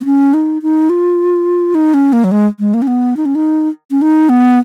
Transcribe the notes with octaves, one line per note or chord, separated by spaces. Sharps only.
B3
C#4
D#4
D#4
F4
D#4
C#4
A#3
F#3
G#3
G#3
A#3
C#4
B3
D#4
C#4
D#4
C#4
D#4
B3